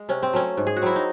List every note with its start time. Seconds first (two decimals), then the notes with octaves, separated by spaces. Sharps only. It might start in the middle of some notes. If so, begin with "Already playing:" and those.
Already playing: G#3
0.09 C3 C#4
0.23 C4
0.33 F#3 A3 C#4
0.57 G#2
0.67 G#4
0.76 F#4
0.82 F#3 C4 E4
0.96 D#4